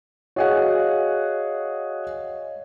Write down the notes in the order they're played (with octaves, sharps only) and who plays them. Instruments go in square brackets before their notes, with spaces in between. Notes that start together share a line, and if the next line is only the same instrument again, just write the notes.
[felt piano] F#4 G#4 F#5 [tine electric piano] C#5 D#5 F5